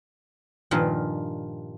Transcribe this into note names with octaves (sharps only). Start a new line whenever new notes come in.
G2 A#2 D#3 F3